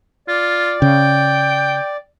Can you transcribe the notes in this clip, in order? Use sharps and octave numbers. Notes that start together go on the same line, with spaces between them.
F4 D5
C#3 G5